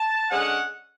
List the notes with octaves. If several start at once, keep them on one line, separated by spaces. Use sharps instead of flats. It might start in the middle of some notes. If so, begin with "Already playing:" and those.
Already playing: A5
D3 G#3 C#4 F#5